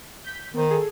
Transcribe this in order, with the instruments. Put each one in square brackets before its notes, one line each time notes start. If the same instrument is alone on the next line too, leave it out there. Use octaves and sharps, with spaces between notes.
[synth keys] G6 B6
[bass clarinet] D#3 [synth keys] B3 C5
[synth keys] G#4 A4